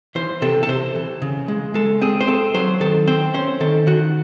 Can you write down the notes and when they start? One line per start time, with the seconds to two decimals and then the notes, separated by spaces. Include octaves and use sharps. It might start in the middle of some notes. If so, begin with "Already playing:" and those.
0.15 E3 C5
0.42 C3 A4
0.63 A4
0.68 C3 C5
0.95 E3
1.22 C#3
1.48 G#3
1.74 G#3 A4
2.01 C4 G#4
2.21 C5
2.27 C4 A4
2.54 F#3 C5
2.80 D#3 A4
3.07 C4 C5
3.34 C#4 C5
3.60 D#3 A4
3.87 D#3 F#4